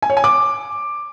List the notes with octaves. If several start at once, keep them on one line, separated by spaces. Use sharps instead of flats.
G#5
C#5
G#5
D6